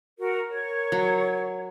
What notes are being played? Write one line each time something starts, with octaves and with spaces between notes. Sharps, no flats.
F#4 A#4
A#4 C#5
F#3